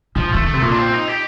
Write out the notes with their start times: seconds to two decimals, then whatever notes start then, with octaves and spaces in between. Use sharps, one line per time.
0.16 A2 F3
0.32 D#3 A3
0.44 D3 A3
0.53 C3
0.62 A#2 A#3
0.71 D4
0.78 C4
0.93 D#4
1.09 G4